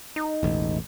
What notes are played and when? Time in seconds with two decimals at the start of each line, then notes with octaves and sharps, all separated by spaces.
0.16 D#4
0.43 E1 A1